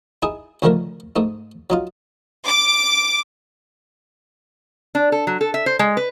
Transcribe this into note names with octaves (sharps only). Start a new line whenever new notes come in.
D#4 E4 G#4
C#2 D3 D#3 F3 A3 A#4
G#2 A3 D#4
F#3 D#4 F4
D6
D4
A4
F#3
A4
E5
C5
G#3
B4